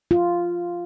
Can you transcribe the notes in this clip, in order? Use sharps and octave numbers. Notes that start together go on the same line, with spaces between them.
F4